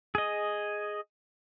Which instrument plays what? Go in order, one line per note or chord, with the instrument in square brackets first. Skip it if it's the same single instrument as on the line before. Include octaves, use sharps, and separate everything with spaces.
[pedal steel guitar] G#4 D#5